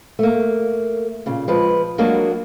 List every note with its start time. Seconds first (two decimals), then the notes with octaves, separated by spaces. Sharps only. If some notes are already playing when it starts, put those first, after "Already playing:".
0.19 A3 A#3
1.26 A#2 C#3
1.48 F3 G#3 B4
1.98 F#3 G#3 A#3 D4 F#4